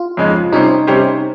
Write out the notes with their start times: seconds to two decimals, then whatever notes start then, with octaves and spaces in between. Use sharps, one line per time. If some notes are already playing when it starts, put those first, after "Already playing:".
Already playing: F4
0.17 F2 C#3 G#3 D#4
0.52 C3 G3 C#4 D#4 G4 C5
0.87 C3 G3 C#4 G4 C5